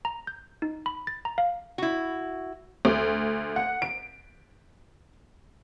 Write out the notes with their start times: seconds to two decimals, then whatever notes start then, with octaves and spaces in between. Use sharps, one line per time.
0.05 A#5
0.27 G6
0.62 D#4
0.86 B5
1.07 A6
1.25 A#5
1.38 F5
1.78 E4 F#4
2.85 D2
3.56 F#5
3.82 D7